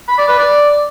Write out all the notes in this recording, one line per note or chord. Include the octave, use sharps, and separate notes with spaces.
B5
D5
B4
D5